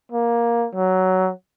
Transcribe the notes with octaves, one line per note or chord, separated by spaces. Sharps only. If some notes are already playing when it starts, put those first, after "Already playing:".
A#3
F#3